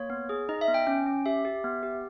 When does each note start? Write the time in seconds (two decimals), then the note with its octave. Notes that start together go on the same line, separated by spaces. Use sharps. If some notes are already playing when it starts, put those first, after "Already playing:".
Already playing: A#3 C#5
0.10 B3
0.29 G#4
0.49 D#4 D#5
0.61 E5
0.68 B3
0.74 G5
0.87 C#4 G5
1.06 C#4
1.25 G4 E5
1.45 G4
1.64 B3
1.83 G4